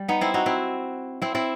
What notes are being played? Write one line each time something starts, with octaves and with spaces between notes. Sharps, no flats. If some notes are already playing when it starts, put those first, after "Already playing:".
Already playing: G3
B3 D#4
C4 E4
D#4 F#4
C4 E4
C4 E4
C4 E4